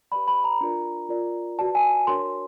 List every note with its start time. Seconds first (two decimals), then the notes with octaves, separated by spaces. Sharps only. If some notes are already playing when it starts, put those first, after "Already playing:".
0.11 G4 B4 D5 B5
0.28 B5
0.44 A#5
0.61 D4 F4 A#4 D5
1.09 F4 A#4 D5
1.59 F#4 B4 D5 A5
1.75 G#5
2.07 D4 F#4 A#4 C#5 C6